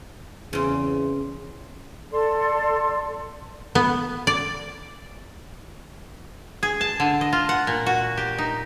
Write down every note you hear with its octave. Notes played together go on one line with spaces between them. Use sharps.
E2 C#3 C4
A4 D5 C6
B3
D5
G#4
A5
D3
D#5
F4
F#5
A#2
F#4
G4
D#4